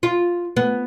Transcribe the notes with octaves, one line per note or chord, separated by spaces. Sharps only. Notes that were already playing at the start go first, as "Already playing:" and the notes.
F4
B3